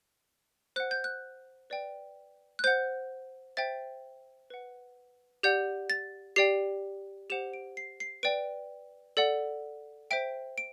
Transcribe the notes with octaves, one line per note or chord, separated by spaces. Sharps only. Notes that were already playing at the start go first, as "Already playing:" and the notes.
C5 F#5 F#6
G6
F#6
B4 D5 G5
F#6
C5 F#5 G6
C5 E5 G5 A6
B4 F#5
G4 D5 F#5 G6
A6
G4 D5 G5 C7
G4 C5 F#5 E7
D7
C7
C7
B4 D5 G5 D7
A4 D5 F#5
C5 E5 G5 D7
D7